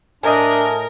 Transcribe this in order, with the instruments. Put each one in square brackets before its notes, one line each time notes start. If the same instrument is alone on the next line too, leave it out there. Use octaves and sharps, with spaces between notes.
[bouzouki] A2 D#5 [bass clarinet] D4 [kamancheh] A#4 [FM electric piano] G#5 A5 D#6